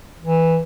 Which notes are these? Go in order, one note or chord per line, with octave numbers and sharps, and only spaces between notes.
E3